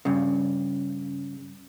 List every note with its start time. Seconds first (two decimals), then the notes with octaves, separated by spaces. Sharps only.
0.05 G2 C#3